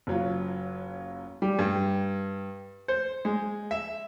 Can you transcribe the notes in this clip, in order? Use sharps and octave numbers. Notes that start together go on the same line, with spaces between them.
F#1 F#3 F4
G3
G2
C5
G#3
E5